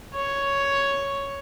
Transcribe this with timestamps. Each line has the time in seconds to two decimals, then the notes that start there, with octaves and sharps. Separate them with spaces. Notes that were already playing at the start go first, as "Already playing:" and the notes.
0.15 C#5